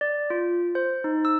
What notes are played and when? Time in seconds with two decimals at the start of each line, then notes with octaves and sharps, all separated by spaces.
0.01 D5
0.30 F4
0.75 C5
1.04 D#4
1.25 E6